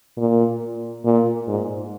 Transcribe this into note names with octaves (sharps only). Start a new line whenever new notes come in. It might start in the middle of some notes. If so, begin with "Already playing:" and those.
A#2
A#2
G#2